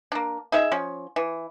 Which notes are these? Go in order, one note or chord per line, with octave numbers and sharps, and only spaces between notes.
A#3 D4
D#4 G#4 E5
F3 C#4
E3